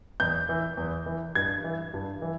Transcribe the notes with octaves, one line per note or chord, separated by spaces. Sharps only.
E2 G6
E3
E2
E3
G2 G#6
E3
G2
E3